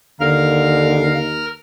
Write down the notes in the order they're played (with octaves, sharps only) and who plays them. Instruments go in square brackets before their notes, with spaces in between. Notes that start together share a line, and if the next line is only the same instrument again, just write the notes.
[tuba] D#2 [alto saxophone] D3 [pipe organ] A#4 F6 [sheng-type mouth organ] F5